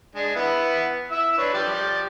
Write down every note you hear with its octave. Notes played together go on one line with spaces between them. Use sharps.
G#3 D4
B3 E4 F#5
E4 E6
D4 B4 C#5
F3 G4 D5